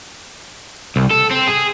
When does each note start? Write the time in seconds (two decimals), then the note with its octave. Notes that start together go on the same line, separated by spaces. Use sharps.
0.96 C2
1.11 A4
1.31 C4
1.47 G#4